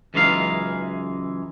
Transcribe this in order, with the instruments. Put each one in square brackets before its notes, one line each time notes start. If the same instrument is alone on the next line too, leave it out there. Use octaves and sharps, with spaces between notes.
[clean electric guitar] C#2 F#2 E3 G#3 D#4 F5